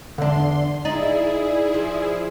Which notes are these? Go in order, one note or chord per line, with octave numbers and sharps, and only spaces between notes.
E2 D3 D4 C6
D#4 E4 G#4 D5
F3